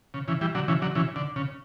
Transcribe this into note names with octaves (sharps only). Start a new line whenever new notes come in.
C#3
C#3 E3
E3 G3
D3 F#3
C#3 E3
D3 F#3
C#3 E3
D3
C#3